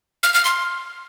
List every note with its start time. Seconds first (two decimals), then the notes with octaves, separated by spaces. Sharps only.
0.23 F6
0.34 F6
0.45 C6